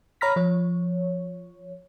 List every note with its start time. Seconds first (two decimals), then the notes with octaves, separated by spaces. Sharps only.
0.21 C#5 A#5 B5 F6 A#6 B6
0.36 F3 C#5